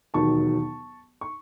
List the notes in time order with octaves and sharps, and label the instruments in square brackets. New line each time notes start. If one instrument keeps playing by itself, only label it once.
[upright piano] E1 D#2 D#3 F#3 A5 C#6
C#6